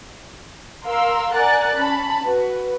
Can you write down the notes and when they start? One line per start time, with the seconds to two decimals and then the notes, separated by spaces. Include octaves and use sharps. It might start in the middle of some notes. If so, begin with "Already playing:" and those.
0.85 A#4 F5 C6 E6
1.34 A#4 D5 F#5 G#5 F#6 A6
1.76 C#4 A5 B5
2.25 F#4 B4